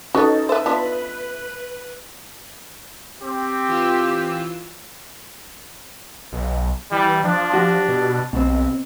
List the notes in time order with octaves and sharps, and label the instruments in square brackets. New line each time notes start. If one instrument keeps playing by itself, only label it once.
[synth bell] C#4 D#4 A4 [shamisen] F#4 B4
[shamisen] B4 C5 [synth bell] E5
[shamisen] F3 B3 D4 [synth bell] B4
[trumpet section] C4 G4
[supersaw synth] E3 F4 E6
[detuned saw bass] B1
[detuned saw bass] E3 [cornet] G3
[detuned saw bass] F3 [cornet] D4
[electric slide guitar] F#4 G4
[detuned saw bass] B2
[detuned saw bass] B1 [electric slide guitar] B2 C4